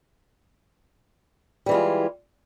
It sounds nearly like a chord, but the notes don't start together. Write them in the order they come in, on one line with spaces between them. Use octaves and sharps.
G3 E3 G#3 F4